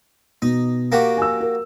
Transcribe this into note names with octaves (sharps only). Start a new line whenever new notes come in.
B2 D#4
A#3 F#4 G4
G#5 E6
A#4